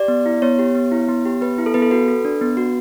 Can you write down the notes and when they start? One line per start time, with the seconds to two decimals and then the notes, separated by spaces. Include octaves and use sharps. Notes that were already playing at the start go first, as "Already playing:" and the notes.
Already playing: G4 D5
0.08 B3
0.26 E4
0.42 B3 C#5
0.59 G4
0.75 B3
0.92 E4
1.08 B3
1.25 G4
1.41 B3 B4
1.58 E4
1.66 A4
1.74 B3 B4
1.82 A4
1.91 F#4 B4
2.08 A4
2.25 D4
2.41 B3
2.57 F#4